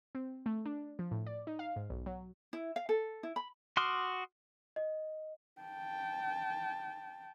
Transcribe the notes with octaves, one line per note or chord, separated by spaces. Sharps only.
C4
A3
D4
F3
A2
D5
D#4
F5
G#2
B1
F#3
E4
F5
A4
E4
B5
F#4 C6 D6 D#6 F6
D#5
G5 A5